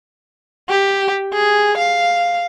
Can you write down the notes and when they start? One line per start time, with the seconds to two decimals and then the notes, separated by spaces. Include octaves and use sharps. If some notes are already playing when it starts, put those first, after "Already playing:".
0.69 G4
1.33 G#4
1.78 F5